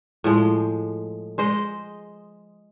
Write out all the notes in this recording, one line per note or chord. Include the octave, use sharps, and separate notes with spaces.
A2 F3 G#3
G#3 C5 D#5